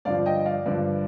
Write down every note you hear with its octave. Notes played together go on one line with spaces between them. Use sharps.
G2 D3 F3 D5 F5
D#5 G5
D5 F5
G2 D3 F3 B4 D5